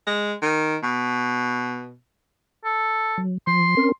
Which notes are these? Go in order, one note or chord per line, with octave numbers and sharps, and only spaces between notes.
G#3
D#3
B2
A4
F#3
F3 C6
C4 C#4 A#4